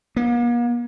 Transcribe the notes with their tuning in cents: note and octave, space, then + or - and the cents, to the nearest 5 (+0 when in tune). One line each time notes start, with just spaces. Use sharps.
A#3 +45